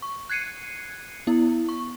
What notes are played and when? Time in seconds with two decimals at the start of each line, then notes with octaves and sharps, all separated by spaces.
0.02 C#6
0.29 F#6 G#6 C7 C#7 D#7
1.27 B3 E4
1.69 C#6